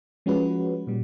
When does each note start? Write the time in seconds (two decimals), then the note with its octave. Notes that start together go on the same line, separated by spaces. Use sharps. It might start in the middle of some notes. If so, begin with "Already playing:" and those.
0.26 F3 G#3 C#4 F#4 B4
0.87 A#2 G3